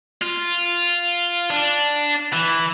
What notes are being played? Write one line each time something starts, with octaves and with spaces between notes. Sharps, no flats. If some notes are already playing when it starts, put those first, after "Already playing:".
F4
D4
E3